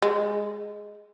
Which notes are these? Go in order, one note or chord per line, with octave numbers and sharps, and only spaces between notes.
G#3